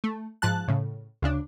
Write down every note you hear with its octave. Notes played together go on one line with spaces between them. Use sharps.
A3
G#2 F3 A5 F#6
A2 C#3
D2 C#3 D4